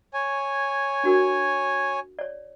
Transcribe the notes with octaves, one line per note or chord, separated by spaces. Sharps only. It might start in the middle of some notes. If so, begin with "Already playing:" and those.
C#5 G#5
D4 F#4 A#4
C#5 D5